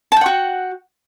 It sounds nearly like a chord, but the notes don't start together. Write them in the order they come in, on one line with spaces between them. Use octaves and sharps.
A5 G5 F#5 F#4